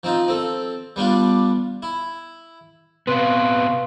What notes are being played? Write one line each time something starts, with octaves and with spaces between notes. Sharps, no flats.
F3 C4 D#4 F4
C4 A4
G3 B3 D4 F4
E4
C3 B3 B4 F5 C6